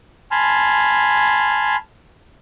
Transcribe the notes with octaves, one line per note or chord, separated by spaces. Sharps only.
G#5 A5 B5 C6 F6